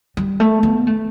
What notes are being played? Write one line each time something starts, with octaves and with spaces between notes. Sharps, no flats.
G3
A3
B3
A3